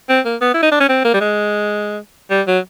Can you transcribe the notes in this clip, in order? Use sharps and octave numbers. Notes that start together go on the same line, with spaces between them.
C4
A#3
B3
E4
D#4
D4
C#4
C4
A#3
G3
G#3
G3
F#3